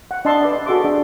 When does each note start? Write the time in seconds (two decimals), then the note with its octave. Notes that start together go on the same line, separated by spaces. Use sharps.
0.11 F#5
0.25 D4 D#5 E5 A5 C6
0.43 B4 D5
0.66 F#4 G#4 A4 E5 C6 D6
0.85 D4